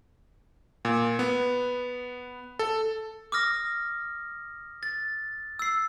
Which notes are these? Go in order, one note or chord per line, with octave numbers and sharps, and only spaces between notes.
A#2
B3
A4
D6 D#6 F6 A#6
A6
E6 C7